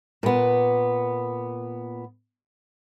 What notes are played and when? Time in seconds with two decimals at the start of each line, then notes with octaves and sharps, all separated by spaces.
0.23 A#2 B3